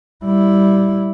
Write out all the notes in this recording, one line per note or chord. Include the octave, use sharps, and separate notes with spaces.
G3 E4